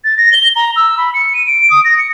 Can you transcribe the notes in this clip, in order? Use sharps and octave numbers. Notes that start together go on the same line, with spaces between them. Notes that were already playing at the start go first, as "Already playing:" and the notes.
A6
A#6
G7
A#5
E6
B5
C#7
D#7
D7
D#6
A#6
C#7